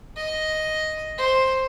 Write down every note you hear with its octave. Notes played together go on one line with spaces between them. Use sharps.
D#5
C5